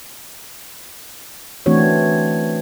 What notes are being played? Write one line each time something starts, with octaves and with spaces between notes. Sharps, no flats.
E3 A3 C4 D4 F#4 C#5